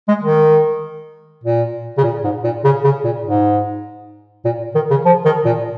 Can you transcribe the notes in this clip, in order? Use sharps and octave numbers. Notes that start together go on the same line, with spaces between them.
G#3
D#3
A#2
C#3
A#2
G#2
A#2
C#3
C#3
A#2
G#2
A#2
D#3
C#3
F3
D#3
A#2